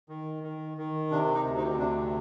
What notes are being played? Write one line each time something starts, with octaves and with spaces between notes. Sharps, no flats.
D#3
D#3
D#3
C3 D4
D#4
D2
D#4
C3 D4